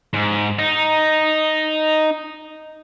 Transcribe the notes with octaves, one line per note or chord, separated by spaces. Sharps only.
G#2
D#4